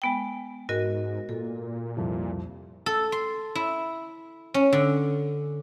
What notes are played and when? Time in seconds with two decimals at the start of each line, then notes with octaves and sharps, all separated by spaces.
0.02 G#3 B3 G5
0.69 G#2 F#4 A#4 D#5
1.29 A#2 A4
1.97 C2 F2
2.86 A4
3.12 C6
3.55 E4
4.54 C#4
4.73 D3